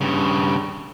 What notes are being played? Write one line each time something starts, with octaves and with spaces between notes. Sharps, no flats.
G2 C#3